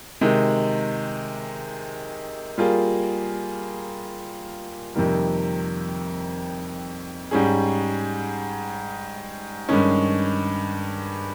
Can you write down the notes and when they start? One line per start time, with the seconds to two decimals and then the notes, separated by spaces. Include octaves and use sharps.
0.21 C3 D#3 G#3
2.58 G3 A#3 F4 G#4
4.95 F2 C3 D#3 G3 A#3
7.31 G#2 G3 C#4 G#4
9.69 G2 D#3 G#3 C#4